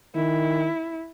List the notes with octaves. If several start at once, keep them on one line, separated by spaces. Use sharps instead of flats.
D#3 E4